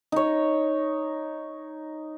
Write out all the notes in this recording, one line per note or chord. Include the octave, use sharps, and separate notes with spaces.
D#4 C#5